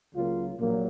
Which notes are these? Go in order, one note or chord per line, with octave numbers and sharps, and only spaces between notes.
C#2 C#3 F#3 A#3 F4
A#1 A#2 F#3 A#3